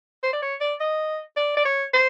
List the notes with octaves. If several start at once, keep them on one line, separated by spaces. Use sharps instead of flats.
C5
D5
C#5
D5
D#5
D5
D5
C#5
C5